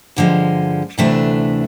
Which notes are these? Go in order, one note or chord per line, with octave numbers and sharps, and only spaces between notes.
G2 D3 F3 G#3
D2 C3 E3 A3 D4